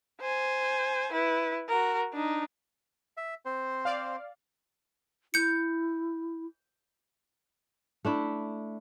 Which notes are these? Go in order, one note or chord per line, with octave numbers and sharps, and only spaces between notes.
C5 G#5
E4 B4
F#4 A#4
D4 D#4
E5
C4 C5
D5 F5
E4 G6 C#7
A3 D4 E4